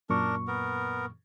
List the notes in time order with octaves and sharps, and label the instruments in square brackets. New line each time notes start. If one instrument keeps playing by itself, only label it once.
[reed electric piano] F#2 A#2 C#6 [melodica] D4 A#4
[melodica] B3 A#4